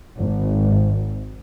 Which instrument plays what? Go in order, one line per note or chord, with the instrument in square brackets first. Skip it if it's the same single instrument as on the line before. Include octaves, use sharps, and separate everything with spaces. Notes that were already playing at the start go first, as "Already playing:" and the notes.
[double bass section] G#1